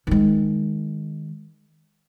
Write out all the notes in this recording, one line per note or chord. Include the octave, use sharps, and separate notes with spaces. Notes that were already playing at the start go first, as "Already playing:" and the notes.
D#3 G#3